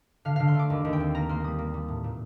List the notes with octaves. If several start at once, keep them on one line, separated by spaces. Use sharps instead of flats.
D3 F5
D3 F5
C6
A3 D6
D#2
D#2
G5
C4
A#3 A#5
A#3 C6
G3 D#6
A#3
G3
A2
A#2